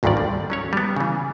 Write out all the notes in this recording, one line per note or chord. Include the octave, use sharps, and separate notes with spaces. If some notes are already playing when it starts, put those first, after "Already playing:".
G#1 D2 G2 D3 D#3 D5
G3
F#3 C#4 C#5
G3 B3
C#3 E3